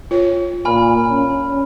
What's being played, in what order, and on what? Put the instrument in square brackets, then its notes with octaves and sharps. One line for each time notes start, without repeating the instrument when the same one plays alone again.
[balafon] F4 C#5
[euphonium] A#2 [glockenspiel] G#5 B5 F6
[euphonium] C#4